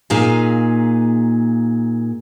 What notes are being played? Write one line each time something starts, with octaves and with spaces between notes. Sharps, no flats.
A#2 D#4 G#4 F5